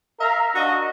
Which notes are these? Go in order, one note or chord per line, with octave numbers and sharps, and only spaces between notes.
A#4 E5 F5 A#5
D4 F#4 D#5